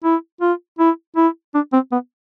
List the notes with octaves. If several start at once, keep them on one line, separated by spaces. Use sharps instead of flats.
E4
F4
E4
E4
D4
C4
B3